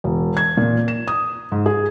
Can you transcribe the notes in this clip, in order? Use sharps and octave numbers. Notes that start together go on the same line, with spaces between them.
E1
G#6
A#2
E7
D#6
G#2
G#4